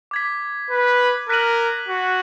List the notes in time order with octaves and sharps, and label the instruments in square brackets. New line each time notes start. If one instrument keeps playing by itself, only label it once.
[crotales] D6 G#6 B6
[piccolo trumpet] B4
[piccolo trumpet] A#4 [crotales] F#6 B6 D#7 F#7
[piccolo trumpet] F#4